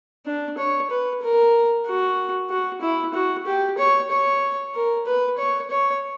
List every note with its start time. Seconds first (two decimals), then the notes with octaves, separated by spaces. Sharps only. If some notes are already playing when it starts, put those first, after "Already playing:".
0.26 D4
0.58 C#5
0.90 B4
1.22 A#4
1.86 F#4
2.50 F#4
2.81 E4
3.14 F#4
3.47 G4
3.78 C#5
4.11 C#5
4.75 A#4
5.06 B4
5.38 C#5
5.70 C#5